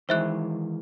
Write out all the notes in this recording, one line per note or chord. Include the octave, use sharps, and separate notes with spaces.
D#3 E3 G#3 C5 E5 F#6